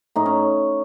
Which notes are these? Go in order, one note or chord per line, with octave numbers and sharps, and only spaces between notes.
A2 D#4
C#4